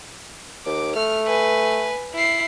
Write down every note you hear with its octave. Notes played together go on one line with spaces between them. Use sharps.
D#2 D6
A3 F6
B4 G#5
E4 C7